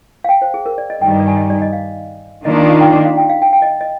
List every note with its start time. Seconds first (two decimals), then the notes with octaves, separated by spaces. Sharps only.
0.24 F5
0.29 G5
0.42 C5
0.54 G#4
0.66 A#4
0.78 D5
0.90 D#5
1.01 G2 D#3 G3 G5
1.11 D#5
1.20 D5
1.28 G#5
1.37 D#5
1.50 D5
1.62 D#5
1.73 F5
2.45 D#3 A#3 D4 F4 D#5
2.57 D#5
2.70 F5
2.81 G5
3.05 F5
3.17 G5
3.29 F5
3.42 G5
3.53 G5
3.62 D#5
3.81 D#5